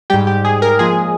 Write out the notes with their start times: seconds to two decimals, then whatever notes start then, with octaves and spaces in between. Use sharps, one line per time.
0.10 G#2 G3 G4
0.27 G4
0.45 G#4
0.62 A#4
0.79 A#2 F3 G#3 G#4